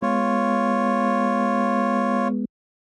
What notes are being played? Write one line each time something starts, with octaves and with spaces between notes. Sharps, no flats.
G#3 B3 F4 C#5